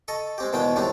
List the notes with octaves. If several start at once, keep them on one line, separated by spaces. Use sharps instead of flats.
A4 D#5 C#6
G#3 C4 G4
E2 B2 D#3 G#3 B3 G5
A2 D#3 G3 C4 D4